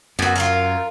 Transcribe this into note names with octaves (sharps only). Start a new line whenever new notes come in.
F#2 B3 F#4
F4 F#4 A#4